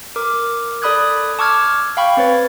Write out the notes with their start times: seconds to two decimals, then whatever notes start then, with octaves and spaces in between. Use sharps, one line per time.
0.16 A#4 D6
0.82 A4 D5 B5 D#6 F#6 G#6
1.39 A5 C#6 D6 E6 F6 G#6
1.97 F5 G5 B5 C#6
2.17 C4 B4 C#5 A6